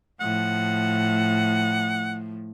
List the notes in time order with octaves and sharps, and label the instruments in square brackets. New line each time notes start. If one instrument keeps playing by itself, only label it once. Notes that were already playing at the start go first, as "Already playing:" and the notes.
[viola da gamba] A2 F3 [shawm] F#5